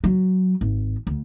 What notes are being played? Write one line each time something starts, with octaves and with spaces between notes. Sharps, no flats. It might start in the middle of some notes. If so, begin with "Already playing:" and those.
F#3
G#1
D2